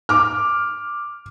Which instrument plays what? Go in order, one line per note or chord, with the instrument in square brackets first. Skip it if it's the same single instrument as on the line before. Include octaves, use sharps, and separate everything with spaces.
[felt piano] D6 F6